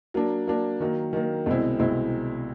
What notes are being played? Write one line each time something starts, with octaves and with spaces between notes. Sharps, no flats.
F#3 A#3 D4
F#3 A#3 D4
D#3 F#3 A#3
D#3 F#3 A#3
C2 B2 G#3 C4 E4
C2 B2 G#3 C4 E4